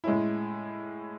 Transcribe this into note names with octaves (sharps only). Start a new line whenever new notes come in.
A2 G#3 C#4 E4